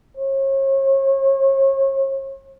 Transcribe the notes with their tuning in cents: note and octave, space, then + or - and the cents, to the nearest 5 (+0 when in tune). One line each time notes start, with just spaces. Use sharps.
C#5 -40